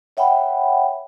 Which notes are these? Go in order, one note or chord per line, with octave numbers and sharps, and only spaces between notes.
C#5 E5 F#5 G5 B5